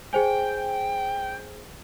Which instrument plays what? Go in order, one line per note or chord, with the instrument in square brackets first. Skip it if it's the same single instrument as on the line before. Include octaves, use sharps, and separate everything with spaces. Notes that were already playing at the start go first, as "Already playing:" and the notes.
[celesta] G#4 C5 G#5 [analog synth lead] G5